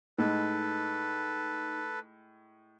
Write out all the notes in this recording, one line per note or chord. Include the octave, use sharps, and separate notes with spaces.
A2 G#3 D#4 A4 B4